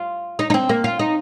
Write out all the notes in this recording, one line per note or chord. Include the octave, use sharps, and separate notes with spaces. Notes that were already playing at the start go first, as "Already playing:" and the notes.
Already playing: F4
D#4
D#4
C4
A#3
F4
D#4